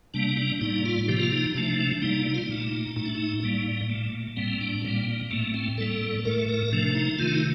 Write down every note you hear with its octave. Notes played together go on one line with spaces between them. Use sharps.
C3 G3 A#3 D4
D4
A2 G3 A#3 D#4
F4
C3 F3 A#3 G4
F4
D#4
C3 F3 A3 D4
D4
D4
C3 G3 A#3 D#4
D#4
F4
D#4
A#2 A3
A2 A3 D#4
D4
D#4
A2 G3 A#3
A#2 A3
A2 G3 A#3 C4
D4
A#2 G3 A#3 C4
A2 A3 A#3
C4
A2 G3 A#3 A4
A2 A3 A#4
A#4
C3 F3 A3 D4
D#4
C3 D#3 A3 F4
D4
D#4